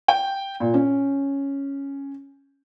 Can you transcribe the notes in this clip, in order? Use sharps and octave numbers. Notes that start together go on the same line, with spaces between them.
G5
A#2
C#4